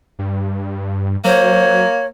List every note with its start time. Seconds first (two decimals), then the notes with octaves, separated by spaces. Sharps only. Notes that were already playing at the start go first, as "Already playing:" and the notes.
0.19 G2
1.25 F#3 A#3 C5 C#5